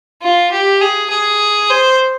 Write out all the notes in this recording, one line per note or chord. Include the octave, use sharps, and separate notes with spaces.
F4
G4
G#4
G#4
C5